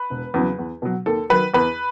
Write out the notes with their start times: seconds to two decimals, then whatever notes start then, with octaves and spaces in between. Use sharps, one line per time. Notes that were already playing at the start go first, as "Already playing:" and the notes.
Already playing: B4
0.10 E1
0.34 E2 C#3 F#3
0.59 E2
0.82 B2 F#3
1.06 D#2 A4
1.30 D#3 F#3 B4
1.54 E2 B4